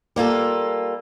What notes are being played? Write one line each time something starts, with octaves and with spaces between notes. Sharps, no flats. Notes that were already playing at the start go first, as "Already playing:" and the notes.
G3 A#3 F4 A4